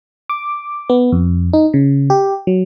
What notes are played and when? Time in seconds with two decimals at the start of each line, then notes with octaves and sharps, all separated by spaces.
0.30 D6
0.89 B3
1.12 F2
1.53 D#4
1.74 C#3
2.10 G4
2.47 F#3